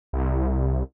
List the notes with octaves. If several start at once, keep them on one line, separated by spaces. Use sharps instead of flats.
C2